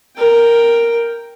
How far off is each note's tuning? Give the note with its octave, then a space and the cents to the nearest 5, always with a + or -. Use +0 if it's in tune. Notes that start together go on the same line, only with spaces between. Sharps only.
A#4 +0 G5 +0